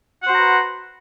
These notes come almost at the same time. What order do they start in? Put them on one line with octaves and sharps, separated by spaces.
F#5 C5 F#4 A#5 B4